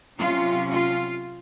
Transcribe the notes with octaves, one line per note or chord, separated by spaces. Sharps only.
C3 F#3 C#4 F4
F4